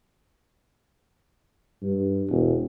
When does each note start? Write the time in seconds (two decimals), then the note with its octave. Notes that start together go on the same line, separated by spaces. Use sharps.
1.82 G2
2.29 E1